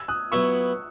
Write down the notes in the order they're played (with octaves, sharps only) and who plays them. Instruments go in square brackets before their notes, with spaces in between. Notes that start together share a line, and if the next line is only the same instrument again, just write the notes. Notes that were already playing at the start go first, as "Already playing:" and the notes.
Already playing: [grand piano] E6 G#6
D#6 F#6
[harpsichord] F#3 B3 E4 B4 E5 [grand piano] C#6 E6